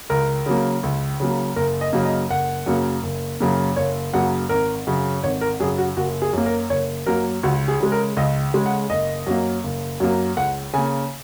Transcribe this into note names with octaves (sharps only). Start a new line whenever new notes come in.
C#2 A#4
C#3 F#3 A#3
C#2
C#3 F#3 A#3
F#1 A#4
D#5
F#2 C#3 F#3 A#3
D#5
F#1 F#5
F#2 C#3 F#3 A#3
F#1
F#2 C#3 F#3 A#3
F#1 C#5
F#2 C#3 F#3 A#3 F#5
G#1 A#4
F#2 C#3
G#1 C#5
A#4
F#2 C#3 G#4
F#4
F#1 F#4
G#4
F#2 F#3 A#3
A#4
F#1 C#5
F#2 F#3 A#3 A#4
C#2 F#4
G#4
C#3 G#3
A#4
C#2 D#5
C#3 G#3
F#5
F#1 D#5
F#2 F#3 A#3
F#1
F#2 F#3 A#3
C#2 F#5
C#3 A#3 G#5